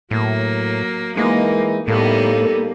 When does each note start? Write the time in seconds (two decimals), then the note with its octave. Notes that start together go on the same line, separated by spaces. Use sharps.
0.11 A2 F#3 A#3
1.17 E3 G#3 A#3 D#4
1.88 A2 G3 A#3 B3 D#4 A4